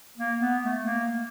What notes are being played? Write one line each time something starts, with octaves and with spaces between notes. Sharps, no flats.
A#3
B3
A3
A#3